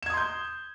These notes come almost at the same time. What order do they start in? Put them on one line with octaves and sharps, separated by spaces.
E7 G#6 D#6 C6 G6